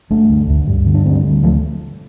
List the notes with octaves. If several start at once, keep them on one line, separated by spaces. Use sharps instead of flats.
G1 A3 D4
D2
D2
G2
D3
D4
D2 G3 C4
D3
F3 A3